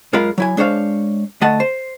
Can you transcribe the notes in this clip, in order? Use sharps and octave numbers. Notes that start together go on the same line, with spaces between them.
F#2 G#3 F4 A#4 F5 B5
F#3 E4 G#5
G#3 D4 C5 C#5 F5
D2 A3 D#5 F#5 A5
C5